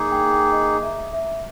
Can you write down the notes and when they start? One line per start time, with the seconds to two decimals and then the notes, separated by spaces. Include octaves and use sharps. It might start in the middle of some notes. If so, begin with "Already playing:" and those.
Already playing: A#3 D#4 G#4
0.12 G5
0.32 G5
0.52 D#5
0.83 E5
1.13 E5